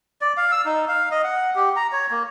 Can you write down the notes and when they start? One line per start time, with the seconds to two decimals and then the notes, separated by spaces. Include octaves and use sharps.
0.21 D5
0.37 F5
0.52 E6
0.65 D#4
0.88 F5
1.11 D#5
1.24 F#5
1.55 G4
1.76 A#5
1.92 C#5
2.11 A#3